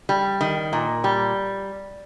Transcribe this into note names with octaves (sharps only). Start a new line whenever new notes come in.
G3
D#3
A#2
G3